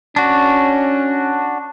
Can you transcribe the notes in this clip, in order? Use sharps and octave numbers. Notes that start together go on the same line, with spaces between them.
C#4 D4 F#4